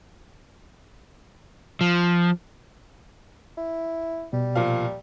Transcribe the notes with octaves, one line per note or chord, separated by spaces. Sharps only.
F3
E4
B2 G3
A#2 F3 F5